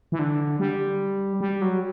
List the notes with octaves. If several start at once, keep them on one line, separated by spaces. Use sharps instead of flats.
E3
D3
G3
G3
F#3